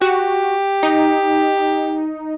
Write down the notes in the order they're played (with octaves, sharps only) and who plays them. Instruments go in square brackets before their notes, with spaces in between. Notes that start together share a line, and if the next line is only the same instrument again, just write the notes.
[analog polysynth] F#4 [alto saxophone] G4
[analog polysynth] D#4